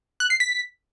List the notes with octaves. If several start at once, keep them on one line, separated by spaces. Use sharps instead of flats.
F#6
C7
B6